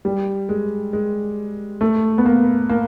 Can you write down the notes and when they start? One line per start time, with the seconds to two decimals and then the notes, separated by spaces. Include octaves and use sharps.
0.05 G3
0.49 G#3
0.93 G#3
1.81 A3
2.18 B3
2.26 A#3
2.69 A#3